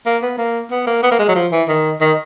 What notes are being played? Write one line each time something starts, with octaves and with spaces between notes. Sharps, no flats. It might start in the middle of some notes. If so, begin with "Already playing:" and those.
A#3
B3
A#3
B3
A#3
B3
A#3
G#3
F#3
F3
E3
D#3
D#3